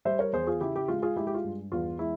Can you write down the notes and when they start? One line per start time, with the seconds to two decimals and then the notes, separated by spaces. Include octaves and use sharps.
0.05 G3 C5 E5
0.19 A#4 C#5
0.33 E2 G#4 C5
0.47 F4 G#4
0.61 C#3 E4 G4
0.75 E4 G4
0.88 G#3 F4
1.02 F4 G#4
1.16 G#3 E4 G4
1.27 G4
1.34 F4
1.44 G2
1.72 E2 F4
1.99 G#3 E4